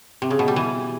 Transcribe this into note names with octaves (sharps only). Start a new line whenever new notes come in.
C3
C#3
B2
G3
E3